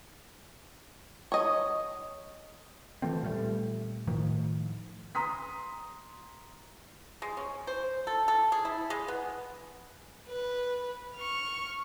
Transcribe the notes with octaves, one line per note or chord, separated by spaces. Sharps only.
C#5 D#5
E3 F3 A3 C4
A#2 G3 A3
A2 D#3 F3
A#5 C6 D#6 B6
G#3
C#4
C5
A4
A4
G#4
E4
G#3
B3
B4
C#6 F6